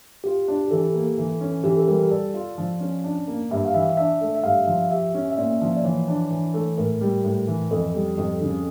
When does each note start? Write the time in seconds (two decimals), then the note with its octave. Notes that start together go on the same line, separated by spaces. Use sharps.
0.24 F4 G4
0.48 D4
0.64 G4
0.71 E3 A4
0.94 A#3
1.18 E3
1.41 C#4
1.64 E3 G4
1.77 A4
1.87 G3 A#4
1.99 A#4
2.11 A4 D5
2.34 F4
2.58 F3
2.80 C#4
3.04 D4
3.28 A#3
3.51 G2 E5
3.65 F5
3.74 E3 E5
3.97 D4 E5
4.21 A3
4.35 E5
4.44 G2 F5
4.67 F3
4.91 G4 E5
5.14 C#4
5.30 E5
5.37 A#2 D5
5.61 F3
5.77 D5
5.84 E3 C#5
6.08 D4
6.30 E3
6.54 A3
6.77 A2 A#4
7.01 G3
7.24 A2
7.47 E3
7.70 F2 A4
7.94 G3
8.17 F2
8.41 C#3